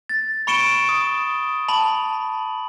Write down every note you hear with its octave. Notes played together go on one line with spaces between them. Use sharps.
A6
B5 C#6 C#7 D7 E7 G7
D#6
A5 B5 F#7